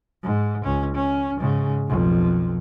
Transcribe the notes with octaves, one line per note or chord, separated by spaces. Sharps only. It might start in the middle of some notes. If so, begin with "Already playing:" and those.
G#2
C#2 C#4
C#4
G#2 C#3
B1 F2